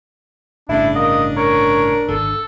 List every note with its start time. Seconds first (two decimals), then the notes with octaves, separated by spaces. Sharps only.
0.69 G1 A2 C#3 D4 E4
0.96 A#3 D#5
1.37 A#4 C#5
2.09 G#1 D3 A4